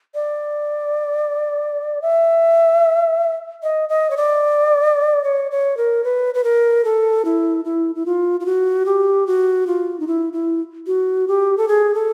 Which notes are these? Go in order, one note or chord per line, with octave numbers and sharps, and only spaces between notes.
D5
E5
D#5
D#5
C#5
D5
C#5
C#5
A#4
B4
B4
A#4
A4
E4
E4
E4
F4
F4
F#4
G4
F#4
F4
D#4
E4
E4
F#4
G4
A4
G#4
A4